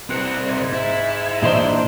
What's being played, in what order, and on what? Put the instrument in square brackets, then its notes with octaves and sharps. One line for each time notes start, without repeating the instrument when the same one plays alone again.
[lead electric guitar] C2 C4 [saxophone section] E3 D#4 F#5
[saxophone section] G#2
[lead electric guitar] E4
[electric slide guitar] A#2 E3 D4 [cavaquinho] D#4 C5